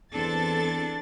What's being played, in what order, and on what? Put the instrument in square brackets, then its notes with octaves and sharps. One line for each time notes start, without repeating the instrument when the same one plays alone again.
[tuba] E2 [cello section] C4 A4 [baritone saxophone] D4 [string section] A6